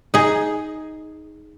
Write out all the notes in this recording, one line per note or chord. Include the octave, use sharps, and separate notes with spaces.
D#4 G#4